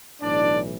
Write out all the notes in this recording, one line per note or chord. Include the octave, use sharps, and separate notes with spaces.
B1 A2 E3 D4 D5